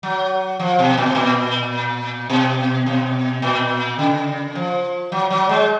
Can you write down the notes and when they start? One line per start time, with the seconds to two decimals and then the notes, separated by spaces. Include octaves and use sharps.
0.03 F#3
0.59 F3
0.79 B2
0.97 A#2
1.06 B2
1.15 A#2
2.30 B2
2.86 B2
3.42 A#2
3.99 C#3
4.55 F3
5.12 F#3
5.30 F#3
5.49 G#3